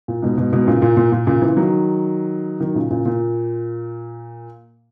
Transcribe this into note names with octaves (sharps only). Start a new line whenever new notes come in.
A#2
G#2 B2
G#2 B2
G#2 B2
A#2 C#3
A#2
A#2
A#2
A#2 C#3
C#3 E3
D#3 F#3
D#3 F#3
A#2 C#3
A#2 C#3
A#2